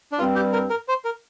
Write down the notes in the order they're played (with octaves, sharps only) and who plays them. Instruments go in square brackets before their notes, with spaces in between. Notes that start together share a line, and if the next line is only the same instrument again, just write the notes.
[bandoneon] D4
[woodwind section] G2 G3 C4 [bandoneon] F4
[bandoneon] G4
A#4
A#4
C5
A#4